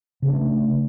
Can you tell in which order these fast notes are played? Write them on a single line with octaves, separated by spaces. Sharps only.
C#3 C4 D4 A3